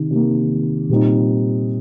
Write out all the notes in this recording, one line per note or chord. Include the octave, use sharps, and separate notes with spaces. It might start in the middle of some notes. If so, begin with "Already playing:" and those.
Already playing: C3 D#3
C3 D#3 A#3
A#2 G3 C4 D#4